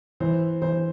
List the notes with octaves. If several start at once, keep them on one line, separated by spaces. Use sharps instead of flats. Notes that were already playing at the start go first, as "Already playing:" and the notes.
E3 C5
E3 C5